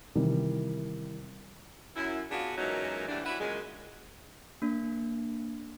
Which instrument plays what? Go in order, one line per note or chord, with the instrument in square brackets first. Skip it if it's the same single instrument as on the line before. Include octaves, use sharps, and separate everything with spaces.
[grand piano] C3 D#3 E3 G3
[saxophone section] F#2 E4
B3 D4 F4 F#4 G#4
F#2 A#2 E3 F#3 G#3 D#4
D3 E3 G3 A3 D4
E3 E4 F#4 B4 F#5
F#2 A#2 C#3 G#3
[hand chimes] A#3 D4